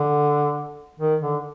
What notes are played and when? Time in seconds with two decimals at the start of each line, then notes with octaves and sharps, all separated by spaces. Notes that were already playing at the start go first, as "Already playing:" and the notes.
Already playing: D3
1.00 D#3
1.22 D3